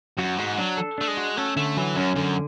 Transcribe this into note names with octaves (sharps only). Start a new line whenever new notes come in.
F#2 F#4
G#2 F#4
F#3 D4
A4
A3 D4
G#3
F#4
A3 C#4
D3 A3
E3 F#3
F#2 C#4
F#2 D3